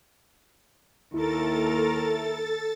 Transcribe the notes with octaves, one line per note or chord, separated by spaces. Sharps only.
D#2 E4 A4 A#4 A6